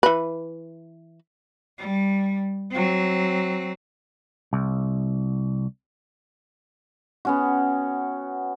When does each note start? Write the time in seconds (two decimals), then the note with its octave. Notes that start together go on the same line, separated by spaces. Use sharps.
0.03 E3 B4
1.78 G3
2.71 F#3 C4
4.53 C2
7.25 B3 C#4 F#4